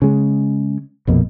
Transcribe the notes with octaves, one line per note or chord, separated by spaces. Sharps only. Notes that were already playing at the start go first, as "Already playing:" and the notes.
C#3 G#3
A#1 F2 B2 A#3